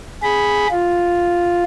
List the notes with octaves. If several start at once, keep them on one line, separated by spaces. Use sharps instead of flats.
G#4 B5
F4